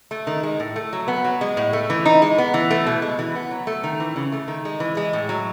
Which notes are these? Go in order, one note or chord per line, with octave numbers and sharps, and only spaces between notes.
A3
D#3
G#3
A2
A3
F#3
B3
F#3
G#3
A2
A3
E3
D#4
G#3
B3
E3
A3
B2
G#3
E3
B3
F#3
A3
D#3
E3
C#3
A3
D#3
G#3
E3
G#3
A2
F#3